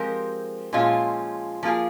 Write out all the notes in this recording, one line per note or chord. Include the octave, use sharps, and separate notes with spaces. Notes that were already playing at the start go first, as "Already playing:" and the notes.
Already playing: F3 G#3 C4 G4 A#4
A#2 F3 G#3 C#4 F4
F3 A#3 F4 G#4